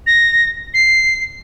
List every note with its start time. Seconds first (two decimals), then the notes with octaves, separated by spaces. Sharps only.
0.07 A#6
0.74 C7